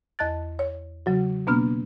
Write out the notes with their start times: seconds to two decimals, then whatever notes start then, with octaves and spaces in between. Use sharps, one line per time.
0.19 E2 D#5 A5 F#6 A6
0.59 C#5
1.06 C#3 F#3 F#4
1.47 B2 A#3 B3 D4 F6